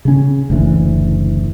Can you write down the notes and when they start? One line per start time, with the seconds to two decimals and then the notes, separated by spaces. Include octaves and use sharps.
0.05 C#3 C#4
0.50 F#1 D2 E3